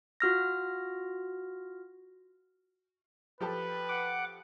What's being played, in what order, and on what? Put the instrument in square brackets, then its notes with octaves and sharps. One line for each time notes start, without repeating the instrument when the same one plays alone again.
[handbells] F4 F#4 F6 A#6
[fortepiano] F3 G4 A4 [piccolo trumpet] B4
[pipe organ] F#5 D6